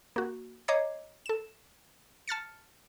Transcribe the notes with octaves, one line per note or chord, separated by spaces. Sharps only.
A#3 F#4
C#5 D#5 A#5 D6 G#6 C7
A4 E7
A5 F6 A6 C#7